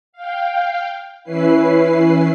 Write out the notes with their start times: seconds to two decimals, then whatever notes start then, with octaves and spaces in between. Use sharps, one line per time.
0.13 F5 G5
1.24 E3 C#4 E4 B4 C7